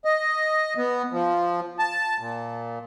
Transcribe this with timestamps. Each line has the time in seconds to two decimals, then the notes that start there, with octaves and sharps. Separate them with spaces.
0.05 D#5
0.77 B3
1.12 F3
1.79 A5
2.20 A#2